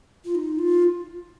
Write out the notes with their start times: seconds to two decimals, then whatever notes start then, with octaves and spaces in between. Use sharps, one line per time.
0.25 F4
0.35 D#4
0.59 F4